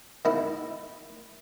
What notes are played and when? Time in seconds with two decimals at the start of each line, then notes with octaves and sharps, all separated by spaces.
0.25 D#3 E4